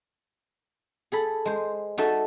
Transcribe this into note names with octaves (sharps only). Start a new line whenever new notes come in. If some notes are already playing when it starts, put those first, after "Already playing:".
G#4 A4 B5
G#3 C5
D#4 F#4 A4 D5 E5